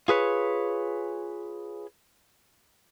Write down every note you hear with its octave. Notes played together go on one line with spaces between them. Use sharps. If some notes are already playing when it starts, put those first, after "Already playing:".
F4 G#4 B4 C#5